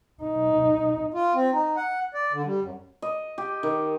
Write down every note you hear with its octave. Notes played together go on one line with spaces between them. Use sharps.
D#4
F4
C4
D#4
F#5
D5
D3
G3
F#2
D#5
G4
D#3